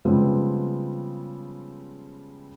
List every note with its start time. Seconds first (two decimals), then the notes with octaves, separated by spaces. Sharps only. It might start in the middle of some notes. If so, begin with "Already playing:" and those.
0.05 C#3 F3 G3 G#3 B3 C4